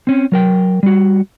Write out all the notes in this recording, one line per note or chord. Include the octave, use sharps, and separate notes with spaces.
C4 C#4
F#3 A#4 G5
G3 F#4